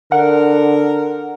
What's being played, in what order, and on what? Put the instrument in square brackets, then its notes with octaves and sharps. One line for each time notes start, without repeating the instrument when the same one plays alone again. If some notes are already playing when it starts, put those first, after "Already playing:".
[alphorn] D3 [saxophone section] A#4 [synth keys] F#5